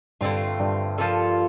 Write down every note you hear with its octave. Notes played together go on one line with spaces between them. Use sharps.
G2 D3 A3 C4 F4
G2
F3 A#3 F4 A4